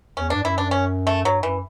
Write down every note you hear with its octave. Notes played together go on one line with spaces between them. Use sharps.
E2 C#4
G2 D4
F#2 E4
D4
C#4
A3
G2 F#3
F#2 E3